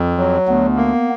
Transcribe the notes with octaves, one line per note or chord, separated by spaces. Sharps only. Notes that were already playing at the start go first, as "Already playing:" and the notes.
Already playing: F2
F#3
D2 B3
A#3